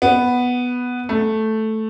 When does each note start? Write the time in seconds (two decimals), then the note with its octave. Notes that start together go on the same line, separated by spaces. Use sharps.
0.02 B3
1.09 A3